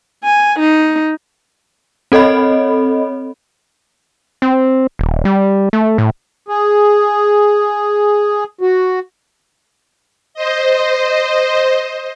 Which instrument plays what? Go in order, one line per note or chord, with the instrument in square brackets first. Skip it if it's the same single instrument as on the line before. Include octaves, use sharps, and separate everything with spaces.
[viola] G#5
D#4
[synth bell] C4 A4 C#5 D#5 B5
[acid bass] C4
D#1
G3
A3
A2
[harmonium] G#4
F#4
[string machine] C5 D#5